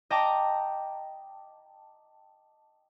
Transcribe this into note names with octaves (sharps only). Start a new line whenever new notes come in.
D#5 G5 A5 A#5 D6